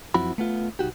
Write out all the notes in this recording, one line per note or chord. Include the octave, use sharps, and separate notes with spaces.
F#2 F3 C4 E4 F#4 B5
A3 B3 F4
C2 D#4 F#4 G4